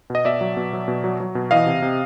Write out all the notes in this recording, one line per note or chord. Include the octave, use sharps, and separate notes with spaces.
B2 D#5
B2 D5 E5
F#3
B2
F#3
B2
F#3
F#3
B2
E3 D#5 F5
C3
C3